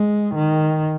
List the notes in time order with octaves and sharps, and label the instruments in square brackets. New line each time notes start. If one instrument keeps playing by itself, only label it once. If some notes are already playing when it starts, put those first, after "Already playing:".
Already playing: [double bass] G#3
D#3